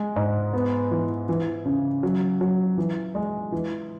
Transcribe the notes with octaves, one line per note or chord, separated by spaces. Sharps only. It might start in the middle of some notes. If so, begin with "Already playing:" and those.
Already playing: G#3
G#2
B3
E3
E3
C#3
F#3
F#3
E3
G#3
E3